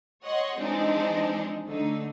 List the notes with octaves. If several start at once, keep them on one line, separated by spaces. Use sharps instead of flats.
C#5 D#5 F#5 C6
E3 F3 G#3 C4 D4 D#4
D3 A3 D#4